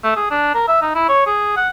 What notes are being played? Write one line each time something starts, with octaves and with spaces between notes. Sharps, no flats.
A3
G#4
D4
A#4
E5
D#4
E4
C#5
G#4
F#5